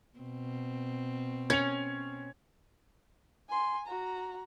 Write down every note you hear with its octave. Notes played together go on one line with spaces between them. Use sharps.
B2 C4
C#4 G#6 C#7 F7
G#5 C6
F#4 A#5